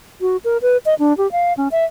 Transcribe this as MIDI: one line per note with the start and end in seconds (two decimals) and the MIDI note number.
0.21 0.37 66
0.44 0.58 70
0.62 0.77 71
0.86 0.95 75
0.99 1.16 62
1.18 1.30 67
1.32 1.53 77
1.57 1.68 61
1.72 1.85 76